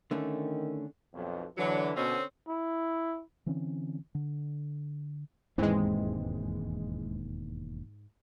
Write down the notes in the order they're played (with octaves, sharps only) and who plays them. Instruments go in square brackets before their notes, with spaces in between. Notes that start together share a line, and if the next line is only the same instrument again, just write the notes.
[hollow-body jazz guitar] D3 A3 C#4 [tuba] D#3
[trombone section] B1 F2
[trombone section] D3 E3 [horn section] F#3
[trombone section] B2 [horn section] D3 C4 C#4
[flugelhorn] E4
[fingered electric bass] D3 E3 C4 C#4
D3
[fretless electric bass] E1 D#2 C4 [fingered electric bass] G#2 [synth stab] E3 G#3